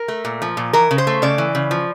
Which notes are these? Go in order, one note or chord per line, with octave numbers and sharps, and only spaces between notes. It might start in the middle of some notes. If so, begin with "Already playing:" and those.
Already playing: A#4
A3
A#2
F3
A#2
E3 A#4
C#3
C5
A3
C#3 D5
E3
C#3
F3